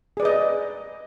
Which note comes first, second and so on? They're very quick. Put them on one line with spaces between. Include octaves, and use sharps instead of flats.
G#4 D5 B4 D#5